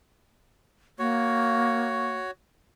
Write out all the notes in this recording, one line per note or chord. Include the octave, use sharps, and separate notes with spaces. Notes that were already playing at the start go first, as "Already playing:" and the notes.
A#3 F#4 C#5